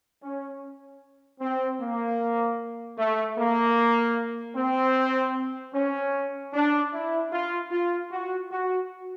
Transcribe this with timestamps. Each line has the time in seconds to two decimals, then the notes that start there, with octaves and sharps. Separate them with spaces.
0.22 C#4
1.40 C4
1.80 A#3
2.98 A3
3.37 A#3
4.56 C4
5.74 C#4
6.53 D4
6.93 E4
7.32 F4
7.71 F4
8.11 F#4
8.50 F#4